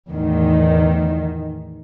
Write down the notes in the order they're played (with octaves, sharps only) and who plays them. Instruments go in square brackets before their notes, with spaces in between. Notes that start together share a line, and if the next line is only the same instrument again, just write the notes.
[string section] E2 A2 D#3